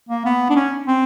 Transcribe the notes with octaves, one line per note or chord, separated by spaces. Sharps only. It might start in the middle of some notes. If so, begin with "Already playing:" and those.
A#3
B3
D4
C#4
C4